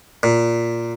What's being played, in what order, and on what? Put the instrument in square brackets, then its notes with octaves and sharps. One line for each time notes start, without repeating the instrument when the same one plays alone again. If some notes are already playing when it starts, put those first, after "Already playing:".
[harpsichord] A#2